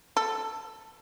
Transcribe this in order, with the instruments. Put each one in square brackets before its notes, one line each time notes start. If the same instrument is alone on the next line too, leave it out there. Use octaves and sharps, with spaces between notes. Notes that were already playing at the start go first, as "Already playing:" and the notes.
[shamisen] A4